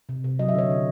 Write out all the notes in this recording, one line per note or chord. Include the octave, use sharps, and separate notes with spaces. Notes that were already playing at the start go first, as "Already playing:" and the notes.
C3
C3
F#3 D#5
E5
D3 C#5 D#5
D3